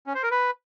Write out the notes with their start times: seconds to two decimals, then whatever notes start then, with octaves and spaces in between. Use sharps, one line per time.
0.07 C#4
0.15 C5
0.23 A#4
0.31 B4